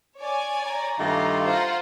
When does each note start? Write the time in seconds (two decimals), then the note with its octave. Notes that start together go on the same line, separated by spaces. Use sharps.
0.17 C#5 D5 G#5
0.68 A#5
0.98 G2 D#3 A3 F4
1.45 F4 C5 F#5 A#5